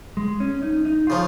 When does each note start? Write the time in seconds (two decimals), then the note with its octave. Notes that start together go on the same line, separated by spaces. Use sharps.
0.17 G#3
0.40 C#4
0.62 D#4
0.85 D#4
1.07 C#3 F3 F4